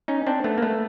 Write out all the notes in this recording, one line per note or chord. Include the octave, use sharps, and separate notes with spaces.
C#4 D#4
C4 D4
A3 B3
A#3
A3 B3